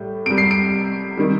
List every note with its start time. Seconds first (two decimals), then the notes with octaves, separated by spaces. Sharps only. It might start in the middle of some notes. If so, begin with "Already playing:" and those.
Already playing: A2 G3
0.25 C3 G3 D7
0.38 C7
0.51 D7
1.17 C3 D#3 G3